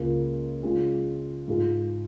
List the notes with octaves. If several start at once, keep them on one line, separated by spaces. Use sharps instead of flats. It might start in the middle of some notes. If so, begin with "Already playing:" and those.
Already playing: C#2 C#3 A#3 F4
C#3 G#3 C#4 F4
G#2 G#3 F4 G#4